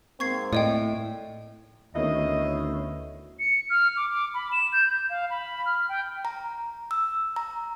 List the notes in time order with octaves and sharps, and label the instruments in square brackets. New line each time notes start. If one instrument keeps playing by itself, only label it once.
[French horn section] G#2 A#3 C4 [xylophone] C#6 G#6 C7
[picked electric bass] A2 [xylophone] D5 D#5 G5
[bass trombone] D2 [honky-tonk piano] D#3 B3 C#4 [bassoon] E4 [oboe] D#5
[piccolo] C#7
F6
D6
D6
B5
E7
G6
G6
F5
B5
F6
G5
[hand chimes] A#5
E6
A#5